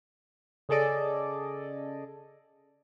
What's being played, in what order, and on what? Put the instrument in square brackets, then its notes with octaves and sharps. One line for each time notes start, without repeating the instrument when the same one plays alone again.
[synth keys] C#3 G#4 A4 D5 D#5